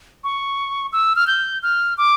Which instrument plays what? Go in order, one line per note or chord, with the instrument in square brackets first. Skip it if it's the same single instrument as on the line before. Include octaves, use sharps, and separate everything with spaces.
[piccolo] C#6
E6
F6
G6
F6
D6